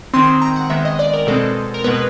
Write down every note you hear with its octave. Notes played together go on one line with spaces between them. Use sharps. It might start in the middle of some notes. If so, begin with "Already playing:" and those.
D#3 G#3 C4 C6
A#5
F#5
D#3 G#3 B3 E5
D#5
D5
A#4
B2 G#3 C4 A4
A#4
B2 G#3 B3 B4